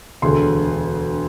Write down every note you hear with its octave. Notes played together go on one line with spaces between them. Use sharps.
E1 D2 D3 C6